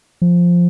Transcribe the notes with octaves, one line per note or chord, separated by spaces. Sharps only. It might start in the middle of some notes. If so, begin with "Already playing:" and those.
F3